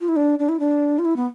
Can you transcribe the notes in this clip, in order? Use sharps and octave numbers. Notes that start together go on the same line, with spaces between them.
F4
E4
D4
D4
E4
D4
F4
E4
B3